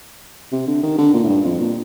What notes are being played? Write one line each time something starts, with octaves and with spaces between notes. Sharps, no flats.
C3
D3
D#3
D3
A#2
A2
G2
F2
A#2